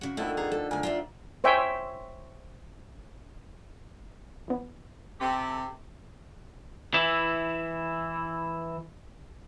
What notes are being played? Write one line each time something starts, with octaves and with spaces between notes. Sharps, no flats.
C#3 F#4
D3 D#3 F3 A3 B3 E4
B3 G#4 A#5
A4
D2 A#4 G#5
F4 D5 E5
C5 C#5 E5 G5 G#5
E3 B3
C3 G4 A4
E3 E4